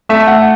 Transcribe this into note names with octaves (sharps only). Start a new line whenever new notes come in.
A3 E5
F#5